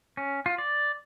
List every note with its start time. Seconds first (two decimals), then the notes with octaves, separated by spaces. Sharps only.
0.17 C#4
0.46 F4
0.58 D5